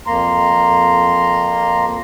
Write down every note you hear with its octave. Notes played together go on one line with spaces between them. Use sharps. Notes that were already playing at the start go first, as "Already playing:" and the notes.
F2 A#3 A#5 C6